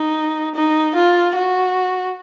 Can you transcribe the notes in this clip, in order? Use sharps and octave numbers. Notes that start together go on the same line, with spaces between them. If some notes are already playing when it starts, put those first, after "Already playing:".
Already playing: D#4
D#4
F4
F#4